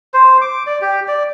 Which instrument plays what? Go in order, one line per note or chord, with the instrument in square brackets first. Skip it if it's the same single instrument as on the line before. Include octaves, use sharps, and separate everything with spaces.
[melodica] C5
D6
D5
G4
D5